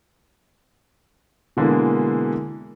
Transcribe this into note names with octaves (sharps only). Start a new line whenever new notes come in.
B2 D3 E3 G#3 A#3